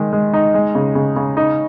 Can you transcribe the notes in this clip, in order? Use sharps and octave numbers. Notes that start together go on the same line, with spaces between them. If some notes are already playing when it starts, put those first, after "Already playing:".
Already playing: D#3 G#3
G#3
D#4
G#3
C#3
C#3
C#3
D#4